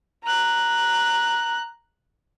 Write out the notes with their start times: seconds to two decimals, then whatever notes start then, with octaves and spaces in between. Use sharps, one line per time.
0.24 A#5 F#6